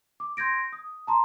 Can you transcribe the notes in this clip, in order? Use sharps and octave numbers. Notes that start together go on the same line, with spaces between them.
D6
C6 G6 G#6 A#6 D7
D#6
A5 A#5 C6